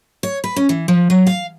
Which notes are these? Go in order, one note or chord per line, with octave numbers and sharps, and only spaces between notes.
C#5
B4
C#4
E3
F3
F#3
F5